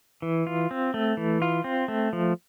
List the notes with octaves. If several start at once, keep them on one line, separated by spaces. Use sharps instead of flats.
E3
F4
C4
A3
E3
F4
C4
A3
F3